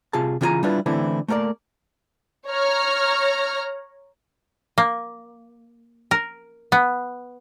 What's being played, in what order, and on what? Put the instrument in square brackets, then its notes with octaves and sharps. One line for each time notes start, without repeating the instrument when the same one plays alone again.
[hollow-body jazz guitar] C3 F4 G#4 A5
C#3 E3 F4 G4 G#5 A#5
G3 D4 E4 F4 B4
D3 E3 A3 C4 E4
A3 A#3 A#4 C#5 D5
[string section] C#5 A#5 F6
[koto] A#3
A#4
B3